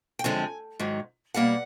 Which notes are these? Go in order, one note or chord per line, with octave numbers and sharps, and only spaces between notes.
G5
F#2 D3 F3 G#3 C4 G#5
G#2 D#3 F#3
B2 G3 A#3 F#5